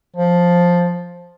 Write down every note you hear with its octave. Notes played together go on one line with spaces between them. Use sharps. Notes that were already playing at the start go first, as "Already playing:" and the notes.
F3